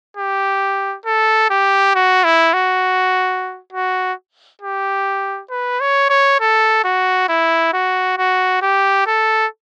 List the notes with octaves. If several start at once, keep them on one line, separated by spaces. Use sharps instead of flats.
G4
A4
G4
F#4
E4
F#4
F#4
G4
B4
C#5
C#5
A4
F#4
E4
F#4
F#4
G4
A4